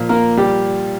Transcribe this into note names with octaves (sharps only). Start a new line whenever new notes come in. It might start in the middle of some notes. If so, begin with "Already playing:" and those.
Already playing: A#2 F3
A#3 A#4
G3 G4